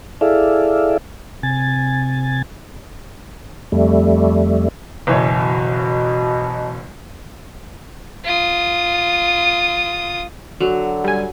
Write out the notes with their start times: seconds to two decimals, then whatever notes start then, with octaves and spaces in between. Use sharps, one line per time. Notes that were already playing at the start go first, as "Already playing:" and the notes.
0.21 E4 G#4 A4 D5 E5 F5
1.43 C3 G#5 A6
3.72 F2 G3 A3
5.07 F#1 B2 E3 C#5
8.24 F4 D#6
10.60 D3 F#3
11.04 G3 G#5